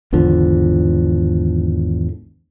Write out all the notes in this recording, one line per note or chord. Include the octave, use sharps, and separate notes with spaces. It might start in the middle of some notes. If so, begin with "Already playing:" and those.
G#1 E2 D3 F3